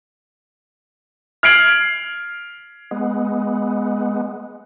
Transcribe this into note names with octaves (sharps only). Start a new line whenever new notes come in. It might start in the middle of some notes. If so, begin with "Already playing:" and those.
F6 G#6 C7 D7 F#7
G#3 B3